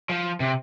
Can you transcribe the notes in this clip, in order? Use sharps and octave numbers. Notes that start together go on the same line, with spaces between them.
F3
C3